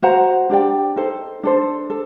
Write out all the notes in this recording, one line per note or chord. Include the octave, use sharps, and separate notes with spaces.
F#4 C5 F#5 A#5
D4 G4 D5 G5
D#4 A4 C5
D4 A4 C5
A4